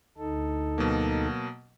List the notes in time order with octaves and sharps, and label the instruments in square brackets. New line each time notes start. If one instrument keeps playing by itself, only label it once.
[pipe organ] D2 D#4 A4
[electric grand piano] B2 F#3 A#3